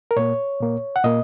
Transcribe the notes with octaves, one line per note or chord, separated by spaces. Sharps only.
A#4
A#2 A#3 C#5
A#2 A#3
F#5
A#2 A#3 D#5